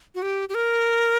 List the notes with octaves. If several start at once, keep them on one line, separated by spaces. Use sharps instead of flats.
F#4
G4
G4
A#4